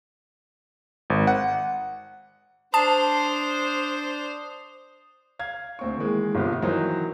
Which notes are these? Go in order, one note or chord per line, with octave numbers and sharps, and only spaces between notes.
G#1
F#5
D4 C5 A5 D#6 C7
F5 G#6
D2 C4 C#6
D#3 E3 G#3 A#3
G1 C3 B3 F4
D#3 E3 F#3 D#4 C5